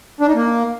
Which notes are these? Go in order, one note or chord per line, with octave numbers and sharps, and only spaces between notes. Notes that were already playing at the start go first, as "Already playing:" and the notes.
D4
D#4
A#3